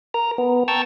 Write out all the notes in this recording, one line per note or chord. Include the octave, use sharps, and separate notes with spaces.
A#4 A#5
B3
G5 A5 A#5 C#6 E6